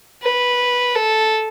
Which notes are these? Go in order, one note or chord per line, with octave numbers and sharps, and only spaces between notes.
B4
A4